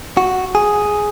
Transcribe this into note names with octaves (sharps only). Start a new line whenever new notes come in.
F#4
G#4